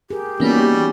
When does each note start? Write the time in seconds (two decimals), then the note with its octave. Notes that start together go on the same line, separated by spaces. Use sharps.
0.10 G4 G#4 A#4
0.40 E3 G3 A#3 B3 C#4 D#4 F#4